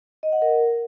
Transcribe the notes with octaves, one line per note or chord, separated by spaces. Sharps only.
D#5
F#5
A#4